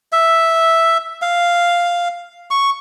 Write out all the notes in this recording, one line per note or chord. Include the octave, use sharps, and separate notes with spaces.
E5
F5
C#6